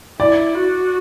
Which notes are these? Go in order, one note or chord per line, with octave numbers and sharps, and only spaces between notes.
E4 D5
F#4